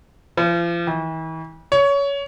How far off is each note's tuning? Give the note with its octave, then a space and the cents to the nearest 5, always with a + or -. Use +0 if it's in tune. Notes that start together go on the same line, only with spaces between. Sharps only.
F3 -40
E3 -40
C#5 +20